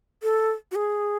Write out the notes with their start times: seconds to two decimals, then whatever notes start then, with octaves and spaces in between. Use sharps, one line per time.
0.23 A4
0.72 F#4
0.75 G#4